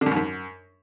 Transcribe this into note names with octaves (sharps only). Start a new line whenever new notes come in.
D3
F#2
G#2
F#2